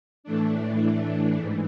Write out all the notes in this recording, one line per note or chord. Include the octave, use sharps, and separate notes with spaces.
A2 E3 A3 D4
G#2 E3